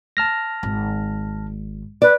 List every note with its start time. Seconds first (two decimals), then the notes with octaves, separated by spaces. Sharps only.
0.17 A5 F6 A#6
0.63 G#1
2.02 B4 D5